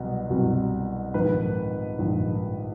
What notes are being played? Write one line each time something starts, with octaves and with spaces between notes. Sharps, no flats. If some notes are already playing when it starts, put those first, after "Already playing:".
Already playing: C2 B2 F#3
C2 B2 F#3
A#1 G#2 D#3 B4
A#1 G#2 D#3